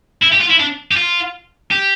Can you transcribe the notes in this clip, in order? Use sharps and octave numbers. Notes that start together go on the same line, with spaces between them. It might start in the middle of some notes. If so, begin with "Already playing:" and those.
E4
G4
F4
E4
D4
G4
F4
G4